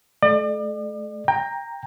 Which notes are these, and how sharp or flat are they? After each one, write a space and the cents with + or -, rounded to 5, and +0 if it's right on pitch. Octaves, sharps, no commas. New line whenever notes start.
A3 -35 D5 +40
G5 +25 A#5 +0